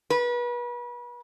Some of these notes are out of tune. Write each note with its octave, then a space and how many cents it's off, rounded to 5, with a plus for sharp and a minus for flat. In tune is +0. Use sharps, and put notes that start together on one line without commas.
B4 -35